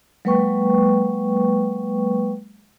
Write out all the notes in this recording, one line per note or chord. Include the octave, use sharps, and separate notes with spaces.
F#3 G#3 A#3 B4 G5 C#6